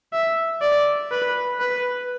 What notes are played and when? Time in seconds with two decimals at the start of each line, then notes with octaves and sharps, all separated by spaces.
0.13 E5
0.61 D5
1.11 B4
1.60 B4